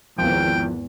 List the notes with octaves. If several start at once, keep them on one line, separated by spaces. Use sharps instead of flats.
G#1 E2 F3 G5